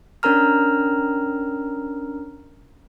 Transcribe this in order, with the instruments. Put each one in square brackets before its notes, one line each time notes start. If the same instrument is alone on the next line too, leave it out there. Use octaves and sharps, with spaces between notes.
[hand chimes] C#4 D4 A#4 A#5 F6